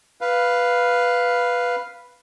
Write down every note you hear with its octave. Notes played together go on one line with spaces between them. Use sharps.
B4 F5